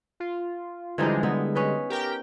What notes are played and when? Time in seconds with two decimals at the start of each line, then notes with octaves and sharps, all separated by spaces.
0.20 F4
0.98 D3 E3 F3 G3 G#3 D#4
1.23 B3 D#4 E4
1.55 C#4 B4 D#5
1.90 G4 A#4 G5